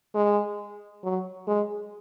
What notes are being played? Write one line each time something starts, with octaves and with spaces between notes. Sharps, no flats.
G#3
F#3
G#3